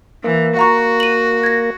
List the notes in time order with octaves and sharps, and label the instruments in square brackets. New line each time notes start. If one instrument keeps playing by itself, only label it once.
[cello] E3 [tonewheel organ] A#3
[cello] F#4 [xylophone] F5 A#5 C#6
[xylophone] D#7 F#7
G#6 A#6